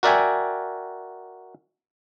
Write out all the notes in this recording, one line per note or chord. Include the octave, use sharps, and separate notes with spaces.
F#4 A#4 D5 E5 G5 G#5